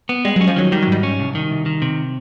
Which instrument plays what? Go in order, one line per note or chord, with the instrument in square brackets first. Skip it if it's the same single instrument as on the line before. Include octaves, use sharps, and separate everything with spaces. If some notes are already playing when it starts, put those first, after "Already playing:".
[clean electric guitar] B3
[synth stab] G3 [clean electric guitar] G#3
[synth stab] F#3 [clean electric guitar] C#4
[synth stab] F3
[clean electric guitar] D#3 [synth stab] F#3
[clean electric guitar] D#3 [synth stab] G3
[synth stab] F#3
[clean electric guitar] G#2 [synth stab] G3
[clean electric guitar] C#4
C2
D#3
C2
D#3
C3